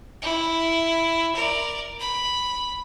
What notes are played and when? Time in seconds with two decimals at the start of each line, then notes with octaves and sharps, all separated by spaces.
0.22 E4
1.36 A#4 D5
2.00 B5